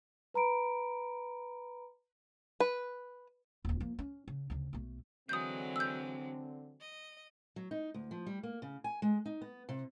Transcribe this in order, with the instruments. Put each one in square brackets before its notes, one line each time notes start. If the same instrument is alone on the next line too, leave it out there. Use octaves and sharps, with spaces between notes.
[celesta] B4 A#5 B5 D7
[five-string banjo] B4
[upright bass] D#1 D2
F3 A#3
C#4
C#3
D2 C#3
B1 A3
[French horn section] D3 C4 [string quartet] E3 F#3 G#3 [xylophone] D#6 G6
[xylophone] E6 G6
[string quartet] D#5
[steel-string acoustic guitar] F#3
D#4
D2
F3
G3
A#3
C#3
G#5
G#3
D#4
B3
C3